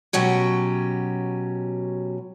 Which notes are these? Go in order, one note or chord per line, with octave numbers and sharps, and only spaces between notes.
B2 F#3 C#4 G4